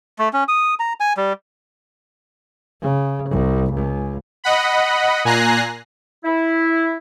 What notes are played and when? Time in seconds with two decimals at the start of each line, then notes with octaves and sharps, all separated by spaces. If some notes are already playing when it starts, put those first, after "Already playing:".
0.19 A3
0.33 C#4
0.48 D#6
0.79 A#5
1.00 G#5
1.17 G3
2.82 C#3
3.29 C2
3.72 C#2
4.44 D#5 F#5 B5
5.25 A#2 G#5 A#5 F#6 A#6 C7
6.24 E4